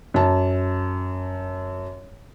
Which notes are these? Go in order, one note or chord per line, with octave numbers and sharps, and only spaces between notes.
F#2 A5